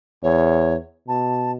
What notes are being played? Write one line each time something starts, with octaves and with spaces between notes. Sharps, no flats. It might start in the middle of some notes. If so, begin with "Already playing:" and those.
E2 C#5
B2 A5